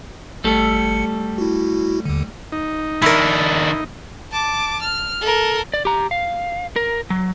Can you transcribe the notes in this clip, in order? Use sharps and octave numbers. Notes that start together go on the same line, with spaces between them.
G#1 G3 A3 A4 C#7
E4 F#4
D#2 D3
D#4
D#3 D4 E4 A#4
A5 D6
F6
A4 A#4
D5
G4 A#5
F5
A#4
F#3